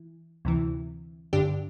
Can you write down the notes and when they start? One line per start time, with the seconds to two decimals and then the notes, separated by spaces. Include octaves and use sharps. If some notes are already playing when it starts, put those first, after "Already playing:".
Already playing: E3
0.45 D2 C3 E3
1.33 G2 D3 D4 G4